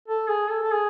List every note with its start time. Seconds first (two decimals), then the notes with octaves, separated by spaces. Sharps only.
0.08 A4
0.29 G#4
0.50 A4
0.62 A4
0.72 G#4